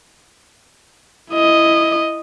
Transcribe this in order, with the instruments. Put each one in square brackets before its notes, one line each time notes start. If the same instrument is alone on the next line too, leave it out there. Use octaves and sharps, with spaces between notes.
[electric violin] E4 D#5